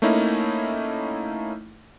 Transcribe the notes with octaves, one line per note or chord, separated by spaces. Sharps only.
A3 A#3 C#4 D#4 E4